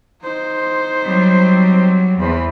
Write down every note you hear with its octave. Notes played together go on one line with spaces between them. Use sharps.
D#4 C5
F#3 G3 C4
E2 C5 B5